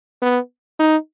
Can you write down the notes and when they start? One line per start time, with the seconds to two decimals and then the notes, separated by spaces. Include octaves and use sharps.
0.22 B3
0.80 D#4